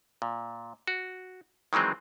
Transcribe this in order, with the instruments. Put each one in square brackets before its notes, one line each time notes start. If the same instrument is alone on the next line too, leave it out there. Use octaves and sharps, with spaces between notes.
[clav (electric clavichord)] A#2
F#4
D#3 E3 F#3 G#3 C4